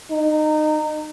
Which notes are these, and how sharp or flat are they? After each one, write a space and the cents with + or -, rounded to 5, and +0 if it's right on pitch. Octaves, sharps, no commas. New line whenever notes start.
D#4 -25